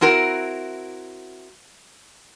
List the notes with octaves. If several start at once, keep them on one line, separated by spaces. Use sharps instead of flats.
C4 E4 F#4 A#4